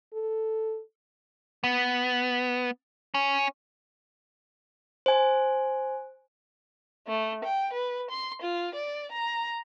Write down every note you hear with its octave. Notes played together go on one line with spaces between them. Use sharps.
A4
B3
C#4
C5 G#5
A3
G5
B4
C6
F4
D5
A#5